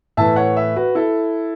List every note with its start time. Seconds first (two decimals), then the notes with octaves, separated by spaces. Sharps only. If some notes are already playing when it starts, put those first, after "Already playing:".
0.17 A2 E3 E5 A5
0.36 C#5 F#5
0.56 B4 E5
0.76 F#4 B4
0.95 E4 A4